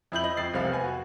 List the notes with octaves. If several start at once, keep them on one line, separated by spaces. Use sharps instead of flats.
F2 E4 G6 F#7
D#5
F2 A6 C7
F1 C2 C4 F5
B3 G#5
F#4